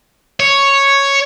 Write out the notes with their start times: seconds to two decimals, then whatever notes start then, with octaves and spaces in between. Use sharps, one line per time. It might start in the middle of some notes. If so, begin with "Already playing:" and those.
0.40 C#5